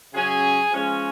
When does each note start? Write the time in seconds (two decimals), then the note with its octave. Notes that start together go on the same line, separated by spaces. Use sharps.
0.13 C#3 F#3 C#4 G#4
0.71 F3 G#3 C#4